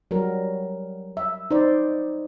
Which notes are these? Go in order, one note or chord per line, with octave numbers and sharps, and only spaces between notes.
F#3 G3 F#4 A#4
E5
D#4 C5 D5